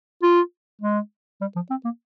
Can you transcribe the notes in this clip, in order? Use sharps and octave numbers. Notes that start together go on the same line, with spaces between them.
F4
G#3
G3
F3
C4
A#3